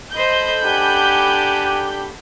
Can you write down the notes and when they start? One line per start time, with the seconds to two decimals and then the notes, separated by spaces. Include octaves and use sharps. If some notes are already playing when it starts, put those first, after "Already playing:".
0.14 A4 C5 D#5 B5 G6
0.64 D4 G4 F#5 G#5